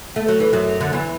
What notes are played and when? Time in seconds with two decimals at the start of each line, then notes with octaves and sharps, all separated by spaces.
0.16 A3
0.28 F#3
0.40 E3
0.53 F#2 F#3
0.81 D3
0.93 E2 E3